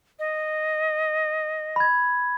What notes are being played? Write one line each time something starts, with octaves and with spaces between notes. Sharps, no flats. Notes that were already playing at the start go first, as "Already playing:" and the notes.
D#5
B5 G#6